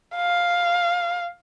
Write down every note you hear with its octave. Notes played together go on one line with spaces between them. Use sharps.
F5